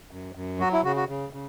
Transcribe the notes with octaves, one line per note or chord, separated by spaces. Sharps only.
F#2
F#2
F#3 F#4
E4
C#3 F#4
F#4
C#3
C#3